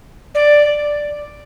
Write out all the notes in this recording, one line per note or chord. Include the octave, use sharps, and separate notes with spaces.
D5